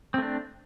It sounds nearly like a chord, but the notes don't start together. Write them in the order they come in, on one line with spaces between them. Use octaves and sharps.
C4 A3 D4